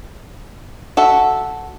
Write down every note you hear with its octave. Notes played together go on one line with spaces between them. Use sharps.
F#4 A4 E5